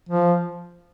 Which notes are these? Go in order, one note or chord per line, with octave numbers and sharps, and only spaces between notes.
F3